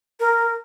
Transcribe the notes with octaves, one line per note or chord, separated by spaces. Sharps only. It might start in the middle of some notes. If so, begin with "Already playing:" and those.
A#4